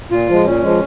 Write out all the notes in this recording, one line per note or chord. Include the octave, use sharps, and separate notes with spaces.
A#2 F4
F3 G#3
A#2 C#4
F3 G#3